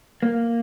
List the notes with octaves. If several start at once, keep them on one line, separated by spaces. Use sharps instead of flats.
A#3